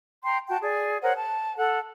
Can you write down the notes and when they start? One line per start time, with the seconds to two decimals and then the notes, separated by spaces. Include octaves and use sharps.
0.24 G5 A#5 C6
0.48 F#4 G5 A5
0.61 G#4 D5
1.02 A#4 C5 C#5 F#5
1.17 A5
1.57 A4 F#5